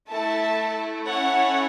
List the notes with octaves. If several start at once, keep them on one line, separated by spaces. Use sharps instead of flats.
A3 E4 A4 E5 A5
C#4 E4 A4 C#5 F#5